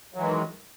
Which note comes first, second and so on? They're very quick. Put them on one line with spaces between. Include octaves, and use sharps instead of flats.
F#3 E3 G#3 D#3